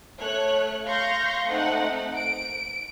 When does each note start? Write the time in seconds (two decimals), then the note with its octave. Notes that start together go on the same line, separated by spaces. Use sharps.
0.19 A3 C#5 F#6
0.86 F5 C6 C#6 G6 A#6
1.47 A3 C4 D#4 F#5
2.15 D7